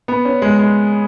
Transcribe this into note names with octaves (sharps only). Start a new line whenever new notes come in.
B3
C#4
G#3
G#3